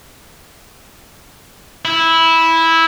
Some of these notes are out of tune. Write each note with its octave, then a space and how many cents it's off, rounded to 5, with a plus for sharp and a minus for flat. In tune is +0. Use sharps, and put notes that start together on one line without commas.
E4 -10